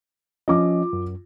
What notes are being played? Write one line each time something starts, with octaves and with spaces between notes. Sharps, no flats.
F3 C#4 F4 D#5 D6
F#2